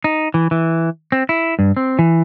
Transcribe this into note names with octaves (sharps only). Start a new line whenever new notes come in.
D#4
E3
E3
C4
E4
G2
C4
E3